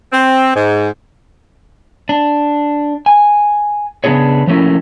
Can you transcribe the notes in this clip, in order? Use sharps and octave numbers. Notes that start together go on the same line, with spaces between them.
C4
G#2
D4
G#5
C#3 B3 D4 D#4 G#4 C#5
F3 F#3 A3 A#3 C#4 E4